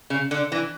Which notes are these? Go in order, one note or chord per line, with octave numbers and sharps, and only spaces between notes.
C#3
D3
E3